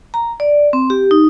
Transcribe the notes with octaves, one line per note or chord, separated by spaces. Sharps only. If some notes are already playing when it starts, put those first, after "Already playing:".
A#5
D5
C4
G4
D#4